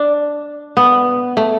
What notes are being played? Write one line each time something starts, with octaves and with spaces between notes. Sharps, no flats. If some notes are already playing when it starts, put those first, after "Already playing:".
Already playing: D4
B3
A3